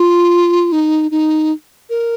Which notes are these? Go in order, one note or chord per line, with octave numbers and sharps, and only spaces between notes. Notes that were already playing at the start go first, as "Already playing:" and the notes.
Already playing: F4
D#4
D#4
A#4